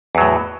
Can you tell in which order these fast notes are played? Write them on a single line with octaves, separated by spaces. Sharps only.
E2 F#3 A2